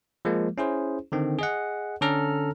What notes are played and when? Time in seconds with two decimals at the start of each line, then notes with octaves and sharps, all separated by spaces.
0.25 F3 G#3 A#3
0.58 C#4 E4 G#4 C5
1.12 D3 D#3 C4
1.39 G#4 D#5 F#5
2.01 D3 C#4 A4 A#5 F6